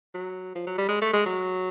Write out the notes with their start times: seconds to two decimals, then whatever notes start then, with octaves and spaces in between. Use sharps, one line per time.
0.15 F#3
0.55 F3
0.67 F#3
0.78 G3
0.89 G#3
1.02 A3
1.13 G#3
1.26 F#3